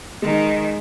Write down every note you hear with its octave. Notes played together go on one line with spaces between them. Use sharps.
D#3 G#3